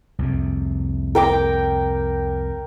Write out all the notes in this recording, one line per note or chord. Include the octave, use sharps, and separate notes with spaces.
C2 F2 C3
A#4 G5 D6